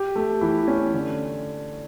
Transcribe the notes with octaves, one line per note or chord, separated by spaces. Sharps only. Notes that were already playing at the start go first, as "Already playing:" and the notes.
Already playing: G4
A3
E3
C#4
D3